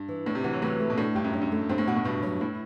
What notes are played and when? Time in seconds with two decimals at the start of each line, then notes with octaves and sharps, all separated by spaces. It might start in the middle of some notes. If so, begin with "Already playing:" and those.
Already playing: G2
0.08 E3
0.26 A2 D4
0.35 C3
0.44 E3 F#4
0.53 F#3
0.62 A2 E3
0.80 A3
0.90 B2
0.98 A2 D4
1.15 G2 G4
1.24 F#2
1.34 F#3
1.42 F#2
1.52 A3
1.69 G2 C4
1.78 A2
1.87 B2 F#4
1.96 A2
2.04 G2 B2
2.22 G2 F#3
2.41 A2 E4